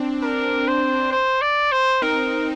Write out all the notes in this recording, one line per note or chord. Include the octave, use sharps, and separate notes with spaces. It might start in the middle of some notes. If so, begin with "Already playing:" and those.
Already playing: C4 D4
D4 A#4
C5
C5
D5
C5
C4 D#4 A#4